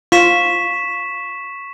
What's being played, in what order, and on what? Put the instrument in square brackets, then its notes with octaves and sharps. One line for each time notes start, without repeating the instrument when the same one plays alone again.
[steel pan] F4 [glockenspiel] C#6 B6 E7